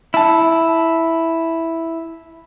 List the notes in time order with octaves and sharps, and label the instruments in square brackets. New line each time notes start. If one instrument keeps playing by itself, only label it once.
[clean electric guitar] E4 A5